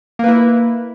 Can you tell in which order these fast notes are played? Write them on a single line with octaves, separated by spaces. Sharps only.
A#3 B4 E4